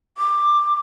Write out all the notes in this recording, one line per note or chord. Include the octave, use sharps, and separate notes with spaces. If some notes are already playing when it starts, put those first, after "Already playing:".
D6